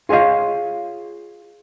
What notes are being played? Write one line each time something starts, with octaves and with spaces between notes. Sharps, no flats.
F4 G#4 C#5 D#5 F5